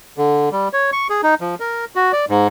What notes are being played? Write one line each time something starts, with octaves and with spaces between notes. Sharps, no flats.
D3
G3
C#5
C#6
G#4
D#4
F3
A#4
F#4
D5
G#2